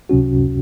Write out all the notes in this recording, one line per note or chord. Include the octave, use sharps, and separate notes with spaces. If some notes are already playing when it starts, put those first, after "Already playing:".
C#2 C3 F#3 C#4 F#4